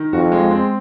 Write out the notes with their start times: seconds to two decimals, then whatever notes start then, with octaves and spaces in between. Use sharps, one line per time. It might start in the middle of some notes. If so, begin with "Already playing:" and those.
Already playing: D#3
0.13 F2 F#4
0.32 G#3
0.51 C4